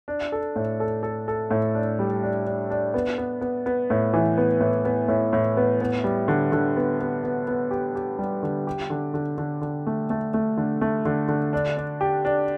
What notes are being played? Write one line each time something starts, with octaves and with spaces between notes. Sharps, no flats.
D4
A4
A2
A4
A4
A4
A2
D4
G3
D4
D4
D4
B3
B3
B3
B3
A2
E3
B3
A2
B3
A2
A2
B3
B3
G3
D3
D3
B3
B3
B3
B3
G4
G4
G3
D3
G4
D3
D3
D3
D3
A3
A3
A3
D3
A3
D3
D3
D4
D4
G4
D4